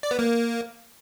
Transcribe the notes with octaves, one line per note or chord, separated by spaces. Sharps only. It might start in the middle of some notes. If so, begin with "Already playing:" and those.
D5
B3
A#3